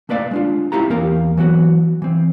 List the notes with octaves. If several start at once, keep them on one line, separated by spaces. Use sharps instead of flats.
A3 A#3 B4 D5 F5
G#3 D4 F4
C4 E4 F4 G4 A#5
E2 A#3 G4 A#4 F5
E3 F#3 B3 F#4
E3 C4